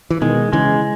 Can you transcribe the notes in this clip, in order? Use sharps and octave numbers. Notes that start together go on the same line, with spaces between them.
E3
B2 D#3 G#3
C#3 E3 G#3